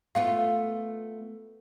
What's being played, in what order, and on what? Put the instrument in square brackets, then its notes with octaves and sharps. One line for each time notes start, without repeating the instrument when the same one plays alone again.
[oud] A3 B3 F4 [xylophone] F5